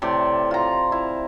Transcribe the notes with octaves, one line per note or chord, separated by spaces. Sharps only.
A2 C3 A4 D5
F4 A#5
E4